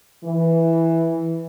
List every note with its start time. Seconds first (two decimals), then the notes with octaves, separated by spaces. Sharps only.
0.24 E3